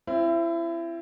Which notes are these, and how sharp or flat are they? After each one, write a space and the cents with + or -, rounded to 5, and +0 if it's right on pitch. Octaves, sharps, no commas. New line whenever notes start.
C4 +15 E4 +30